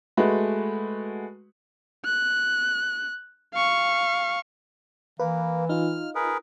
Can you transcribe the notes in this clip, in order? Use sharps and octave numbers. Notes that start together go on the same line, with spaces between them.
G#3 A3 F#4 B4
F#6
F5 C#6
E3 A#3 B4
D#4 F4 F6
G#4 A#4 B4